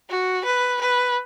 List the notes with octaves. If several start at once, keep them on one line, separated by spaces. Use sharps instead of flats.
F#4
B4
B4